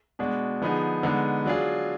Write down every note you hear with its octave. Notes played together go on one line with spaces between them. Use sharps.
B2 G#3 D4 F#4
D3 F3 B3 D#4 G#4
D3 G#3 B3 D#4
F#3 D4 F4 G#4